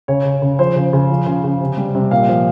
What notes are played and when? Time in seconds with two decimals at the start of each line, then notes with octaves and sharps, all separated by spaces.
0.08 C#3 C#5
0.25 C#3
0.42 C#3
0.59 F3 C5
0.76 C#3
0.93 C#3
1.10 F3
1.26 C#3
1.44 C#3
1.61 C3
1.77 G3
1.95 C3
2.11 A#2 F5
2.29 F3